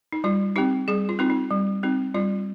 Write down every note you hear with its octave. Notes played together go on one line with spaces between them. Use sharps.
D#4
G3 F4
C4 D#4 G4
G3 G#4
F4
C4 D#4 F4
D#4
G3
C4 D#4
G3 F4